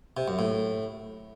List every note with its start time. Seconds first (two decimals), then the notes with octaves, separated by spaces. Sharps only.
0.17 C3
0.28 F#2
0.39 A2